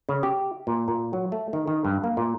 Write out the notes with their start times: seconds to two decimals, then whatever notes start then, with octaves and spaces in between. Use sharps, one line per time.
0.09 C#3
0.23 G4
0.67 A#2
0.88 A#2
1.13 F#3
1.32 A3
1.53 D#3
1.67 D#3
1.85 G2
2.04 A#3
2.17 A#2